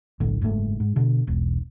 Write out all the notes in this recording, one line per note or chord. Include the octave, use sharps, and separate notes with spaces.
F#1 B1 A2 D3
F#1 G#2 B2 A3
G#2
B2 D3
E1 B1